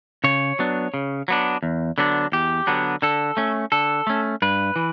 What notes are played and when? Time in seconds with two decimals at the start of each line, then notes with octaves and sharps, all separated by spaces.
0.24 C#3 C#5
0.59 F#3 B3 D4
0.94 C#3
1.28 F#3 B3 D4
1.63 E2
1.98 D3 F#3 B3 D4
2.32 E2 G4
2.67 D3 F#3 B3 D4
3.02 D3 A4
3.37 A3 C#4
3.72 D3 A4
4.07 A3 C#4
4.42 G2 B4
4.76 E3